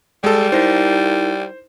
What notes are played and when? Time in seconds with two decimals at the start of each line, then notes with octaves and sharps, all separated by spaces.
0.24 G3 G#3 A4
0.52 D#4 E4 A#4 C5